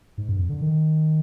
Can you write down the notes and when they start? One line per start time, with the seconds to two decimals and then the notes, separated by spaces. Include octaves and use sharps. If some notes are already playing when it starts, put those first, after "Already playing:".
0.18 G#2
0.29 G2
0.39 F2
0.49 D3
0.61 D#3